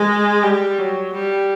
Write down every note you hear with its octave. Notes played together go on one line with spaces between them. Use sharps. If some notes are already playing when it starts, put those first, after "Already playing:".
Already playing: G#3
G3
F#3
G3